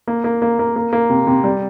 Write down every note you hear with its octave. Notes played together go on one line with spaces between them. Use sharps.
A#3
A#3
A#3
A#3
A#3
A#3
C3
C3
G3